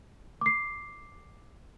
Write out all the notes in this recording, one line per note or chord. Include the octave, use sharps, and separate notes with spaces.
D6 C7